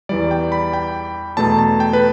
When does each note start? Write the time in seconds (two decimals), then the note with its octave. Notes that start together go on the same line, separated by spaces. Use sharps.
0.09 E2 E3 G3 D5
0.31 G5
0.52 B5
0.73 G5
1.37 E2 B2 A3 A5
1.59 A5
1.80 G5
1.93 B4